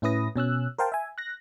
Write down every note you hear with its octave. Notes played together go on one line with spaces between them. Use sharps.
A2 C#4 E4 B4 D#6 A#6
B2 C#4 E6 F#6
A#4 C5 F5 G5 A5
E5 G#5
F#6 A#6